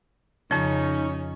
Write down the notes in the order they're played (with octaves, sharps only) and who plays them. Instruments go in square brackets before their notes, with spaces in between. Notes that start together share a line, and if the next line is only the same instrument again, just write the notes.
[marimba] F2 F3 [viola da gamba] C#3 [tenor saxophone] C#4 [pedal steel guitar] D#4